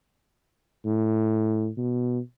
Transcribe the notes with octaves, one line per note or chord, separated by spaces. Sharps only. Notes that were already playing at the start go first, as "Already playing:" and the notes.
A2
B2